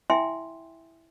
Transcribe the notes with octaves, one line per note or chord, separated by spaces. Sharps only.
E4 E5 G5 G#5 C6